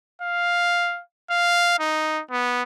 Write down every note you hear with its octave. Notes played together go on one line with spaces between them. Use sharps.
F5
F5
D#4
B3